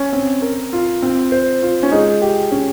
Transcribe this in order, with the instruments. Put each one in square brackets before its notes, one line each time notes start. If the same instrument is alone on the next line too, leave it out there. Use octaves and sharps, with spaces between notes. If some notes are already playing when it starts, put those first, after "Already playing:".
Already playing: [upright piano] C#4
[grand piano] C4
A#4
F4
C4
C5
F4
[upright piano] C#4
[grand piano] G#3 [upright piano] D#4
[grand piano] G4
C#4